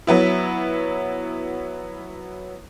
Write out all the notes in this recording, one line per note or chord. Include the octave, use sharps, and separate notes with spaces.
F#3 B3 E4